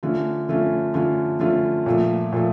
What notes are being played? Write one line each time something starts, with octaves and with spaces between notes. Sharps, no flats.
D3 A3 C#4 F4
D3 A3 C#4 F4
D3 A3 C#4 F4
D3 A3 C#4 F4
A#2 F3 A3
A#2 F3 A3